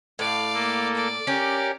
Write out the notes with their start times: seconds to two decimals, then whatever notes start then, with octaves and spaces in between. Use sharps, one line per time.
0.19 A2 D5 F5
0.54 A#3 A4
0.95 D5
1.27 C#4 G4 A#4